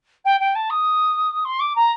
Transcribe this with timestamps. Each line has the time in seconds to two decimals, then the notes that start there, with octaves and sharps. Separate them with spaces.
0.25 G5
0.40 G5
0.55 A5
0.70 D#6
1.44 C6
1.59 D6
1.75 A#5